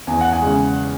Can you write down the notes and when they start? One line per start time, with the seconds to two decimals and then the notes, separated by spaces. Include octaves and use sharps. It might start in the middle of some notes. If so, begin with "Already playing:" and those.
0.07 E2 G#5
0.21 F#5
0.33 G#5
0.42 C#3 G#3